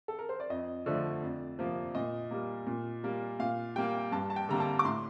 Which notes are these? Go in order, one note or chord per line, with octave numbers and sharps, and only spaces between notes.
A4
A#4
C5
D5
F2 D#5
D3 F3 A3 D5
F2
C3 F3 A#3
A#2 D#5
G3 A#3
A#2
G3 A#3
A#2 F5
G3 A#3 G5
G2 A5
A5
G5
D3 G3 A#3 A#5
A5
D6
A2 C6